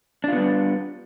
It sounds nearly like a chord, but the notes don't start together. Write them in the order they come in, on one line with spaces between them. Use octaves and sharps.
D4 F4 B3 G3